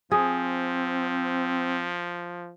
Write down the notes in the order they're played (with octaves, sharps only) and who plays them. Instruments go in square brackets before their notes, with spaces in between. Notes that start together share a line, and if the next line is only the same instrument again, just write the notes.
[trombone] F3 [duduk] C4 [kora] G#4